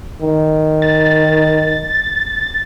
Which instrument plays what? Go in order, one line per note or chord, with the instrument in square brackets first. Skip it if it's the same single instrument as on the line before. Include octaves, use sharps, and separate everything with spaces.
[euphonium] D#3
[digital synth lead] A6